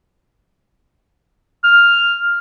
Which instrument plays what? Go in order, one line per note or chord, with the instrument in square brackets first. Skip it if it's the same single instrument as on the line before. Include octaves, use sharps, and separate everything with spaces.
[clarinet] F6